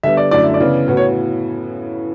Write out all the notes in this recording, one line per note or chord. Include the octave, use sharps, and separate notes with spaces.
D3 G3 B3 E5
D5
F#2 D3 F#3 A3 E4 D5
E5
D5
C#3 E3 B3
A2 E3 B3 F#4
C#5